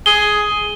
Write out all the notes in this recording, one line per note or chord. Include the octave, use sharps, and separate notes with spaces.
G#4 G7